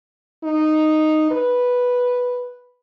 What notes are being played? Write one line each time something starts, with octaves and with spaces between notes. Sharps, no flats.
D#4
B4